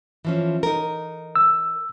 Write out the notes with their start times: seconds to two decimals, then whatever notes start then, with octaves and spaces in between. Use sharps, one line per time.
0.25 E3 F3 C#4
0.63 D#4 A#4
1.36 E6